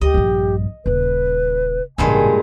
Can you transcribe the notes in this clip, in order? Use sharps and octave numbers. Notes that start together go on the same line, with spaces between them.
D2 G4 D#5
A#1 G2
D#1 C#3 B4
A1 G2 A#2 C#3 G#3 G#5